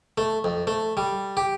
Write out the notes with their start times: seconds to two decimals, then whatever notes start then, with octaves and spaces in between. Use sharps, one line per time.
0.18 A3
0.44 F2
0.67 A3
0.97 G3
1.37 G4